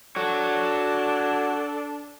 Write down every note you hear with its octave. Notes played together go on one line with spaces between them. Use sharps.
D4 F#4 A4 C#5